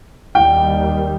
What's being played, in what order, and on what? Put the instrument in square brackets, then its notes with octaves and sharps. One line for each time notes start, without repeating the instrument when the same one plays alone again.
[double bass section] D#2 D#3 G3 [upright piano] G5